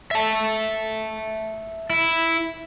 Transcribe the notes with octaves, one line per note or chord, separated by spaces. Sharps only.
E5 A5
E4